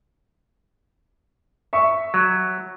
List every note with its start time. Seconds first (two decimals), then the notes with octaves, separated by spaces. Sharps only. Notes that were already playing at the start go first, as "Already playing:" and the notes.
1.73 E5 C#6
2.14 F#3